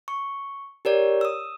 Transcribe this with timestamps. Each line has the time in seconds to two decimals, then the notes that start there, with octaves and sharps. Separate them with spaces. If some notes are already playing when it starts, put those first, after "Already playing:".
0.08 C#6
0.85 G4 A#4 C#5 D5
1.21 D#6 E6